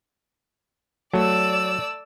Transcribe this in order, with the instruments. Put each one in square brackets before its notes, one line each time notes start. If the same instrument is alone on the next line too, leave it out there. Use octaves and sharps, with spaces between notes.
[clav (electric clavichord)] F#3 [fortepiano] A3 [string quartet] D5 E6